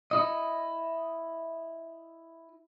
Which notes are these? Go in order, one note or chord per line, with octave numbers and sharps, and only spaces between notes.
E4 D#5